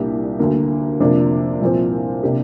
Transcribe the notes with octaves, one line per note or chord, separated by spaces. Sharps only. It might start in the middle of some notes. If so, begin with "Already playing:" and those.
Already playing: C2 A#2 A#3 D4 G4
D2 D3 A#3
F2 C3 A#3 D4
C2 A#2 F3 C4
C3 A#3 D4 G4